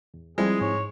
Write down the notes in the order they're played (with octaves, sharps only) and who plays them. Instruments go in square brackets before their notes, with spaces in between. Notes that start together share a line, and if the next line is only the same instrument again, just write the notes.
[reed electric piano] E2
[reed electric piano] F3 C4 E4 [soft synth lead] G3 [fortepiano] G#3 [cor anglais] G#4
[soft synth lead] G#2 [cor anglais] C#5